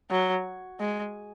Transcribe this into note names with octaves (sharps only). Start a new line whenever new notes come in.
F#3
G#3